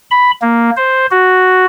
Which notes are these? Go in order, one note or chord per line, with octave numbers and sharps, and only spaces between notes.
B5
A#3
C5
F#4